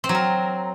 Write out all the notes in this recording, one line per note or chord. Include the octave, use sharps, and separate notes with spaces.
C4
F#3
A#4